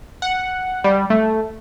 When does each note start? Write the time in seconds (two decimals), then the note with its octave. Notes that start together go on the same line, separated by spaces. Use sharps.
0.22 F#5
0.84 G3
1.10 A3